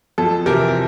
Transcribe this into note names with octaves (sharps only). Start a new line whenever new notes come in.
F2 A4
C3 E3 G4 A#4